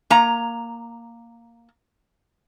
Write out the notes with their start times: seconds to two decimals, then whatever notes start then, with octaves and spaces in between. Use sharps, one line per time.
0.10 A#3 A#5